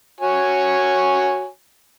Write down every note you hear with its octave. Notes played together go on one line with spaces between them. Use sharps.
F#4 C#5 G#5